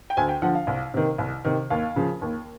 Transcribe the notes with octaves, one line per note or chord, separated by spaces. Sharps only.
G5
D2 G#5
G5
D3 F3 F#5
F5
C2
C3 D#3
C2
C3 D#3
D#2 F5
C#3 F3
D#2